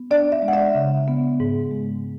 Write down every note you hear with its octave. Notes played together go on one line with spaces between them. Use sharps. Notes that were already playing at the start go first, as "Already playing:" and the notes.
Already playing: B3
D4 D5
E5
G#3
F#5
E5
C#3
B3
G#2
G#3